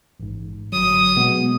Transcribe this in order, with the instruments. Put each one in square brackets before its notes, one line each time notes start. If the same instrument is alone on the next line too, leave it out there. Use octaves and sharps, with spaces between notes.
[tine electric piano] A1 G#2
[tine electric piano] G1 F#3 [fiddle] D#6
[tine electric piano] B2 G#3 B3